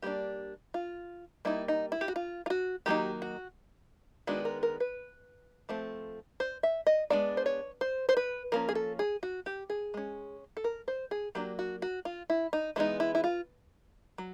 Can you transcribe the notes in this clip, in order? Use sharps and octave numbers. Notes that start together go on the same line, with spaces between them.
G3 A#3 D4 G4
F4
G3 A#3 D#4 E4
D#4
E4
G4
F#4
F4
F4
F#4
D#3 F#3 A#3 D#4 G4
F#4
D#3 G#3 B3 D4 F#4
A#4
A#4
B4
F3 A3 C4
C5
E5
D#5
G#3 B3 D4 D5
C5
C#5
C5
C5
B4
F3 A#3 C#4 A#4
G#4
A4
G#4
F#4
G4
G#4
G#3 C#4
A4
A#4
C5
G#4
F#3 A#3 D4 G4
F#4
F#4
F4
E4
D#4
E3 G#3 B3 D#4 E4
E4
E4
F4
F#3